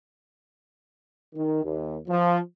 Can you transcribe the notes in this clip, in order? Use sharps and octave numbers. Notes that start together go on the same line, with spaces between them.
D#3
D#2
F3